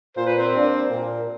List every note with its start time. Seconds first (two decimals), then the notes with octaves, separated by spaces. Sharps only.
0.17 A#2 C5
0.27 B4
0.37 C4 C5
0.53 G3 A#3 D4
0.90 A#2